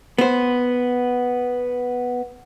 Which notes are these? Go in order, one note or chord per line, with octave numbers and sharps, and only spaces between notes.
B3 C5